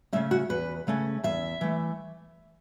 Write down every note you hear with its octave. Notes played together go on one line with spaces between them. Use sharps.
C#3 A3 C#4 E5
F#4
E2 B4
C#3 A3 C#4
E2 E5
E3 A3